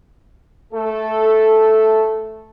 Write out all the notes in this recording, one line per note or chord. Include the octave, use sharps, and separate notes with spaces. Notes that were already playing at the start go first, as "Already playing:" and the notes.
A3 A4